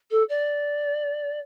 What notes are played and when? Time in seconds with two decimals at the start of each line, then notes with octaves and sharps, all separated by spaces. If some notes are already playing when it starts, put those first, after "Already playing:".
0.10 A4
0.29 D5